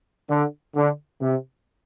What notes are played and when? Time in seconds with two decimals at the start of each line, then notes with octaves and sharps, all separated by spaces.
0.29 D3
0.75 D3
1.21 C3